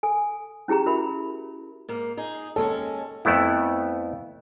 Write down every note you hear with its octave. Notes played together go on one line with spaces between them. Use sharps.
A4 G#5
C#4 E4 G4 G#4 A#5
F#4 A#4 E5 B5
G#2 A#3
D#4 G#4
D#2 G#3 C#4 A4
F2 A3 B3 E4